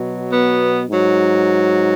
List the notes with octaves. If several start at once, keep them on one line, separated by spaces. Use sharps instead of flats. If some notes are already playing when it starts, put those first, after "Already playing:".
Already playing: B2 F#3
B3
G#2 F#3